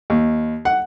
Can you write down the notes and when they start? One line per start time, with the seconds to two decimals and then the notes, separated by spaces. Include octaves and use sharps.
0.10 D#2
0.65 F#5